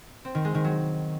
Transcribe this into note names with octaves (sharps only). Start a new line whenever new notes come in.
C4
D#3
G#3
D#3
F#3